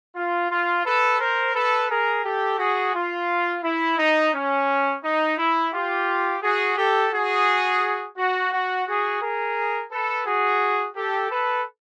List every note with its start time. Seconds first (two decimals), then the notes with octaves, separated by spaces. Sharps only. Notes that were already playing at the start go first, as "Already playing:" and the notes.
0.16 F4
0.51 F4
0.85 A4 B4
1.20 A#4 C5
1.55 A4 B4
1.90 G#4 A#4
2.24 G4 A4
2.59 F#4 G#4
2.94 F4
3.63 E4
3.98 D#4
4.34 C#4
5.03 D#4
5.38 E4
5.73 F4 G4
6.42 F#4 G#4
6.77 G4 A4
7.12 F#4 G#4
8.17 F#4
8.53 F#4
8.87 F#4 G#4
9.21 G#4 A#4
9.91 A4 B4
10.26 F#4 G#4
10.95 G4 A4
11.30 A4 B4